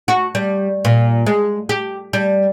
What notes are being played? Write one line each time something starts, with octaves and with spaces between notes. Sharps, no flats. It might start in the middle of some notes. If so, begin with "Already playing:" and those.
F#4
G3
A#2
G#3
G4
G3